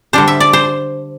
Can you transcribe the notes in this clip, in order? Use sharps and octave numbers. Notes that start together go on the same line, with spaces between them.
D3 G3 D4 C5
E5
D5
C5